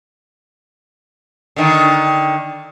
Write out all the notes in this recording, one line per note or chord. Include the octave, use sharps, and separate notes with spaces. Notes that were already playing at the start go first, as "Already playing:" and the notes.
D3 D#3